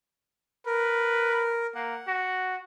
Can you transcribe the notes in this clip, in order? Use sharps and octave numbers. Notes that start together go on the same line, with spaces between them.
A#4 B4
A#3 F#5
F#4